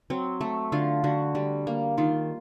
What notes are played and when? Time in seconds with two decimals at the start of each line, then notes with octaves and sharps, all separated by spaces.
0.10 F#3 C4
0.41 A3
0.72 D3 F4
1.04 D3 F#4
1.35 G3
1.67 A#3
1.98 D#3 F4